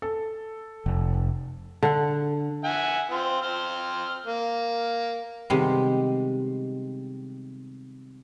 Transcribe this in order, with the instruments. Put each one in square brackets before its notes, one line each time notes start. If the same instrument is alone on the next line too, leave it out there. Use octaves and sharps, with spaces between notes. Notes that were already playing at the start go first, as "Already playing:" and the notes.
[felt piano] A4
[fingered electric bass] F1
[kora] D3 F#5
[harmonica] E5 F#5 G#5
C4 F4
C4 C5 F6
A#3
[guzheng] C3 D#3 G3 G#3 B3 C4